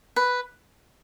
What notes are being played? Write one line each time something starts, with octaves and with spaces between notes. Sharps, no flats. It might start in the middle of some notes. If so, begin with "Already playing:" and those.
B4